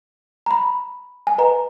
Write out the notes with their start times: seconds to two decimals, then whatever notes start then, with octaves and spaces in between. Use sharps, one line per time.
0.46 A#5
0.51 B5
1.27 G#5
1.38 B4 D#5 F#5 A#5